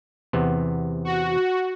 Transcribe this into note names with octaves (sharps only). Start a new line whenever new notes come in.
E2 C3 B3
F#4